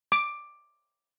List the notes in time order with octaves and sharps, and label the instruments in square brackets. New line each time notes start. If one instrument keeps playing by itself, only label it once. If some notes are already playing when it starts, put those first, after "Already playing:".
[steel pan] D6